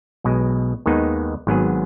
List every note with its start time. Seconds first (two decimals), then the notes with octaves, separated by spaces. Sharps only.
0.24 B1 B2 G#3
0.86 D#2 D#3 G#3 B3 D#4
1.47 G#1 G#2 F#3 B3 G#4